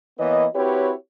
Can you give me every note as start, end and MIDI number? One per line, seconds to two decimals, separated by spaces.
0.19 0.46 52
0.19 0.46 58
0.19 0.46 59
0.19 0.46 71
0.19 0.46 73
0.19 0.46 75
0.55 0.93 60
0.55 0.93 64
0.55 0.93 66
0.55 0.93 67
0.55 0.93 71
0.55 0.93 73